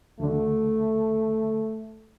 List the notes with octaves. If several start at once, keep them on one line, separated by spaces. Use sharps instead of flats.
D2 D3 A3